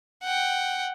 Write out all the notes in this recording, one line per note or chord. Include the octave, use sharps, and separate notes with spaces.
F#5 G5